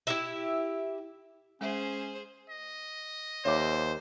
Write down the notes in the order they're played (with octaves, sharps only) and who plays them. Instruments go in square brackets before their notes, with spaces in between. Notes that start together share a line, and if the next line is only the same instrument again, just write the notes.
[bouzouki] E4 G4 E5
[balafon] G#3 E5 [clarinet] C#4 [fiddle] G#4 C5
[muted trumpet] D#5
[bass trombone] D#2 [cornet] C5 [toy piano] C#5 E5 D6